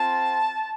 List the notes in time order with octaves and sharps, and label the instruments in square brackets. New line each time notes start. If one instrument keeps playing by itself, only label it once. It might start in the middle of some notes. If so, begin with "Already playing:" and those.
Already playing: [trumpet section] C4 F4 A5